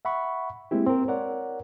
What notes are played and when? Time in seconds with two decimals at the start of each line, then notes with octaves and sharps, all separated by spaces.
0.05 E5 F#5 B5 C#6
0.71 G#3 A#3 C4 E4 G4
0.86 C4 A#4
1.08 A#4 C#5 D5 F#5